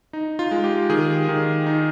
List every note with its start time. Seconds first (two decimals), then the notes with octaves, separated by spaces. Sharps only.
0.13 D#4
0.39 F4
0.51 G#3
0.64 G4
0.90 D#3 G#4
1.28 D#3
1.66 D#4